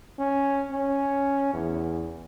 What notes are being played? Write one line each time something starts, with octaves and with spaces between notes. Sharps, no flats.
C#4
C#4
E2